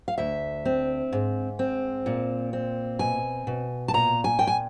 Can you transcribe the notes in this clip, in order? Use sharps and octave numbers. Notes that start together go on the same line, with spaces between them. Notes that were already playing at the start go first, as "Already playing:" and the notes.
F5
D2 E5
C4
G#2
C4
A#2
C4
B2 G#5
B2
A5
A#2 A#5
G#5
A#2 G5
G#5